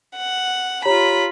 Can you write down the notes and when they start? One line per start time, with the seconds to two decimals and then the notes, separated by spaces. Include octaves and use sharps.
0.17 F#5
0.85 F4 G4 C#5 A#5 B5